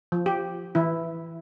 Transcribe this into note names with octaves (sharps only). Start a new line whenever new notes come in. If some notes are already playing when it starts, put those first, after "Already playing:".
F3
G4
E3 E4